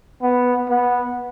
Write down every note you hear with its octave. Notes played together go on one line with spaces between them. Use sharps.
B3
B3